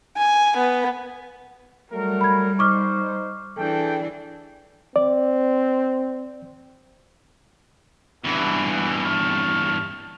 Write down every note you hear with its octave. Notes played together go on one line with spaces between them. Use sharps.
G#5
B3
F#3 G3 A3 A#4
B5 G#6
D#4 C5 C#6 D6 F6
E3 D4 G#4 A4 G5
C4 D5
E2 G2 B2 E3
A5 C#6 F6